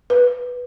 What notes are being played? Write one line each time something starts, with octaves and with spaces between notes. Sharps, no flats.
B4